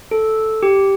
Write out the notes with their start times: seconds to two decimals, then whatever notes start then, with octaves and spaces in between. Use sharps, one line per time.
0.11 A4
0.63 G4